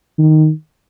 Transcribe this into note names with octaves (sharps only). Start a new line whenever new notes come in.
D#3